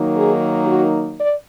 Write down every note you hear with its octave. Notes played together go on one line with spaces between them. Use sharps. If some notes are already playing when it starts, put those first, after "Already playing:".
Already playing: D#3 F#3 A#3 D#4
G#4
F#4
D5